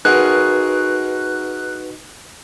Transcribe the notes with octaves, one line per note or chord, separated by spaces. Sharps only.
D#4 F#4 G#4 A#4 B4 F#6